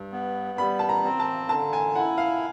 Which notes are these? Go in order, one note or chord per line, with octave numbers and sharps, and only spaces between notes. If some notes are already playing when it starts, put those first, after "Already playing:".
Already playing: G2
B3
G3 B5
A5
A#5
C4
A5
D3 A5
G#5
E4 F#5
F5